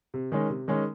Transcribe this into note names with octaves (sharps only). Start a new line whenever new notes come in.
C3
D#3 G#3 C#4
C3
D#3 G#3 C#4